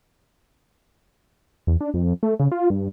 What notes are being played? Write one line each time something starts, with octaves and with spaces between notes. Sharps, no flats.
E2
D4
F2
A3
C#3
F4
G2